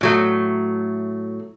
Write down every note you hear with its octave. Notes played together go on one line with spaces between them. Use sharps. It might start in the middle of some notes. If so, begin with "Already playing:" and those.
A2 F#3 A3